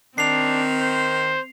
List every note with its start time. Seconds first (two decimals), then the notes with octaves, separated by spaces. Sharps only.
0.18 D#3 C4 D4 C7 F7
0.80 C5